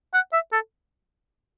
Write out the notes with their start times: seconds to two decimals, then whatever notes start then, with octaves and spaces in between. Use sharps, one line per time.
0.14 F#5
0.33 E5
0.53 A4